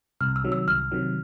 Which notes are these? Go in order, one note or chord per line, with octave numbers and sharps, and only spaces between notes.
C2 F6
E6
C3 D#3 F#3
E6
C2 F6
C3 D#3 F#3